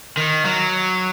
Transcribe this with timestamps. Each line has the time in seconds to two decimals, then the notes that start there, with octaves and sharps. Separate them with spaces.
0.17 D#3
0.45 F#3